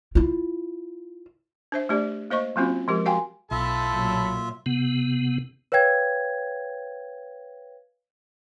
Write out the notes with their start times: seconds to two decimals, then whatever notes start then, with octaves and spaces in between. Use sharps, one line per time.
0.15 E4 F4
1.72 D4 C5 E5
1.89 A3 D4 G4 D5
2.31 A#3 C5 D#5 C#6
2.56 F#3 A#3 C4 C#4 F4 F#4
2.88 F3 G#3 G4 A#4
3.06 F#4 F5 G5 G#5 C6
3.51 B1 F4 A4 E5 A5 B5
3.92 A#2 F#3
4.66 C3 B3
5.72 B4 C#5 F5 G5 G#6